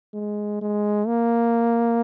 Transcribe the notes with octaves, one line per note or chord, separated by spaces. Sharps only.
G#3
G#3
A#3